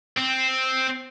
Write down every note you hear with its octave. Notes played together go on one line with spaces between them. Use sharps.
C4